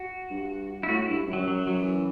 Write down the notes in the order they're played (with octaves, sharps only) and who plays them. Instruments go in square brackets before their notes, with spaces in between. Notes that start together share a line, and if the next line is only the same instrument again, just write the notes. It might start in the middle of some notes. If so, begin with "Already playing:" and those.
Already playing: [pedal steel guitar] F#4
[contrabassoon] G2
[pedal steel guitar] E4
[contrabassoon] A2 [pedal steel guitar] F#4
[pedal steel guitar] E4
[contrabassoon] G2
F#2
[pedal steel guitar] F#3
F#3
F#3
E3